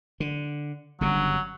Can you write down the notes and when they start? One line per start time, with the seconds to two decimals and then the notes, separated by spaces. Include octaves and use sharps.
0.20 D3
1.01 G1 G2 C#3 F#3